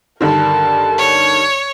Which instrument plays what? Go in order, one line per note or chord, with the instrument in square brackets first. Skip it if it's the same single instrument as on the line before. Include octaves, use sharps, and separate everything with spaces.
[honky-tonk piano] G2 D3 D#3 [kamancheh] A#4 A5
[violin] C#5